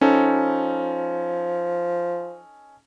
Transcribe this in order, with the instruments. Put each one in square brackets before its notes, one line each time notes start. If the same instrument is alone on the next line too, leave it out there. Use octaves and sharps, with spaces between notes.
[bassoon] F3 [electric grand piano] C#4 D#4 A4